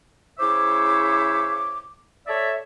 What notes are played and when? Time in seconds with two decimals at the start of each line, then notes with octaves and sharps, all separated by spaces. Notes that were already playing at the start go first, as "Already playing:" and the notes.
0.39 C#3 E4 C5 C#5 E5 D6
2.27 A4 C#5 D5 E5